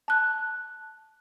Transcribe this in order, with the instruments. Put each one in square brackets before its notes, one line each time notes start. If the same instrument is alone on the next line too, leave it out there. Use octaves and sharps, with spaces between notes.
[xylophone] A5 F#6